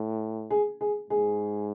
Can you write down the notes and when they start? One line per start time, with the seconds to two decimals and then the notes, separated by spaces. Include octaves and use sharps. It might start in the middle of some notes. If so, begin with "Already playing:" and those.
Already playing: A2
0.51 G#4
0.81 G#4
1.10 G#2 G#4